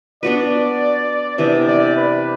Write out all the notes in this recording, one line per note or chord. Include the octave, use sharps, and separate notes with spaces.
B3 D4 F#4 B4 D5
C3 E3 B3 D4 D5
D5
B4